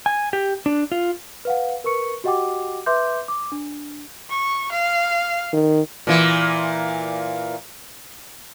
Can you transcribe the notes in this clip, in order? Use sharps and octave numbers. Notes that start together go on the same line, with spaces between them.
G#5
G4
D4
F4
B4 F5 F#5
A#4 B4 C#6 C#7
F#4 G4 D#5 F#5 G5 D6
B4 E5 C6 D6 G6
D6
D4
C#6
F5
D#3
A#2 E3